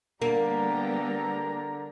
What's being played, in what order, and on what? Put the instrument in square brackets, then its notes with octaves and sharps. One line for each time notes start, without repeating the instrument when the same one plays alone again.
[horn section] D3 A#4 A#5 [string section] G3 B3 G4 [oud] A#3